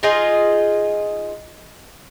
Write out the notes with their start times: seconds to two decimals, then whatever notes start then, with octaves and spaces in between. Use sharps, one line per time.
0.03 D#4 F4 G#4 D#5